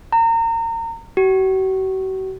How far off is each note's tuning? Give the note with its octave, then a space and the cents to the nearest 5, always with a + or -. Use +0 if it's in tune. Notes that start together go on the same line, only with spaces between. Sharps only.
A#5 -30
F#4 +45